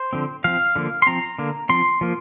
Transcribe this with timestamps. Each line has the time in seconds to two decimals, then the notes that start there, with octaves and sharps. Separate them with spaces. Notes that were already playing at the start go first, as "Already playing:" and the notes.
Already playing: C5
0.13 D3 F3 C4
0.44 F3 C4 F5
0.76 D3 F3 A#3
1.02 C6
1.07 F3 C4 A#5
1.39 D3 A#3
1.69 F3 C4 C6
2.01 F3 A#3